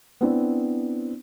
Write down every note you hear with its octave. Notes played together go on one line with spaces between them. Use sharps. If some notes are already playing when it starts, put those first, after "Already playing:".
B3 C4 D4 E4